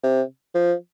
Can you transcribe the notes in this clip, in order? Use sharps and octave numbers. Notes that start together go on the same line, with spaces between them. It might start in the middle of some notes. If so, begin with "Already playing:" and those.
C3
F3